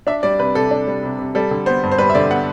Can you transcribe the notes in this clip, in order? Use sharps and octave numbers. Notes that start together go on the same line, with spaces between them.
D4 E5
G3 D5
C3 B4
C3 A4
D4
G3
C3
C3
G3 A4
D3
B3 C5
G2
C5
G3 B4
E5
D3 D5
B3 F#5